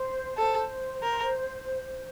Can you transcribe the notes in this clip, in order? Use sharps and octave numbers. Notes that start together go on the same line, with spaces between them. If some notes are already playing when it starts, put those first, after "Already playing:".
Already playing: C5
A4 C5
A#4